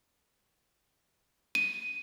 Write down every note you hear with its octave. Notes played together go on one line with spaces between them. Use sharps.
D#7